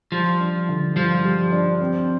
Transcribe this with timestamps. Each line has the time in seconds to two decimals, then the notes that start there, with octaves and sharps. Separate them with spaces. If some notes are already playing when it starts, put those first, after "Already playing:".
0.12 F3 G3
0.40 D4
0.69 D3
0.96 G2 F3
1.25 G3
1.52 D4
1.81 C4